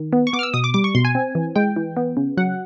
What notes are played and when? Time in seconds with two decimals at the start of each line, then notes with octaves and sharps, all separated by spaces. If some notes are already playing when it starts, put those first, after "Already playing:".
Already playing: D#3
0.13 B3
0.27 C#6
0.33 B3 D6
0.39 F6
0.43 E6
0.54 B2 D#6
0.64 D6
0.74 G3 D6
0.84 C#6
0.95 B2 C6
1.05 G#5
1.15 C4
1.35 E3
1.56 G#3 G5
1.76 E3
1.97 B3
2.17 C#3
2.37 F#3 F#5